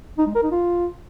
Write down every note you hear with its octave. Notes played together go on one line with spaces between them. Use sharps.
D#4
G#3
A#4
D#4
F4